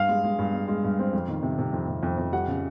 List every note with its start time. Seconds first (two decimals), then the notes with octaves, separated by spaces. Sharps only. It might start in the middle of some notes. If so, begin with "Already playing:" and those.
Already playing: G2 F5
0.09 G#3
0.24 G#3
0.39 G2
0.54 G#3
0.68 G#3
0.84 G2
0.99 C4
1.13 F2
1.28 D#3
1.43 C3
1.59 C3
1.73 F2
1.88 C3
2.03 F2
2.18 F2
2.32 G3 F#5
2.48 C#3